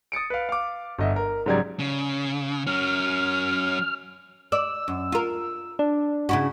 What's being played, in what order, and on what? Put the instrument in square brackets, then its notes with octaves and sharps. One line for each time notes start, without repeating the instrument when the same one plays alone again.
[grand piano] D#6 A6 C#7 D7
B4 F5
F5 D6
G1 D#5 E5
A#4
G#2 C#3 F#3 G3 D5 G#6
[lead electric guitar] C#3
[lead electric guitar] F#3 C#4 [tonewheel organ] F6
[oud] D5 [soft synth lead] E6
[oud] F#2
F4 A#4
[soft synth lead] D4
[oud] C#3 E4 F#4